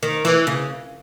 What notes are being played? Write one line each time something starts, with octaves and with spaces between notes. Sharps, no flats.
D#3
E3
C#3